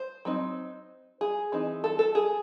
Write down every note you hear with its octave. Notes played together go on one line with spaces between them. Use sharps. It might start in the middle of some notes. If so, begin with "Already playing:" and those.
Already playing: C5
F#3 C4 D#4
G#4
E3 C4 D#4
A4
A4
G#4